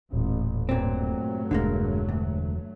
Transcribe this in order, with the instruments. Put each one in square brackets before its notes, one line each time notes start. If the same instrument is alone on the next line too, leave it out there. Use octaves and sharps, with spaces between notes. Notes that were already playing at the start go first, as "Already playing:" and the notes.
[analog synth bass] D#1 [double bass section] A1
[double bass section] G2 F#3 A3 [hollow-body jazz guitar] A#2 C4
[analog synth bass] E1 [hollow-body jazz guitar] D3 G#3 A#3
[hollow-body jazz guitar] D2